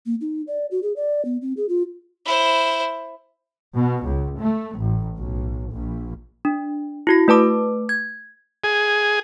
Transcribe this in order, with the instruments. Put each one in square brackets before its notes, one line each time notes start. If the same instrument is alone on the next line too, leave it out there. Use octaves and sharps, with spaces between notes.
[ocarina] A#3
D#4
D5
F#4
G#4
D5
B3
C4
G#4
F4
[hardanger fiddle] E4 C5
[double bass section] B2
C#2
A3
A1
B1
A#1
[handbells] D4
E4 F#4 A#6
A3 B4 A5 D6
G#6
[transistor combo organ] G#4